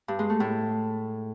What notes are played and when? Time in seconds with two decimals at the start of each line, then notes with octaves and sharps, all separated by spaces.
0.08 G2
0.19 G#3
0.30 A3
0.40 A2